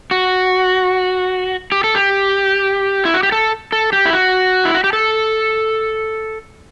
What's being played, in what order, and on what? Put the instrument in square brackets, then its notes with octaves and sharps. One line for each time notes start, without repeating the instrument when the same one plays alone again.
[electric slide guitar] F#4
G4
A4
G4
E4
F#4
G4
A4
A4
G4
E4
F#4
E4
F#4
G4
A4